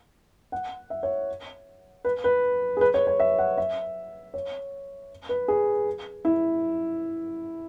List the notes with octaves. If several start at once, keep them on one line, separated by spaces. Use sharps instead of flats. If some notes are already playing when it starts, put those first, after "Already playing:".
F#5
E5
C#5
B4
B4
G#4
B4
C#5
C#5
E5
F#5
E5
C#5
B4
G#4
E4